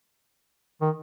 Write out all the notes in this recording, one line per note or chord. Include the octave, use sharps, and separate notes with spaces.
D#3